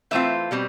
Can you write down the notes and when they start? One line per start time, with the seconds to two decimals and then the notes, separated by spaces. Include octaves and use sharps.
0.11 E3 A3 C4 F4 E5
0.51 B2 G3 C4